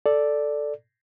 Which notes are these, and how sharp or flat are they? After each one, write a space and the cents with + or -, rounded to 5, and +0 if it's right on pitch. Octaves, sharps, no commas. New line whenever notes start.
A4 +0 D5 +0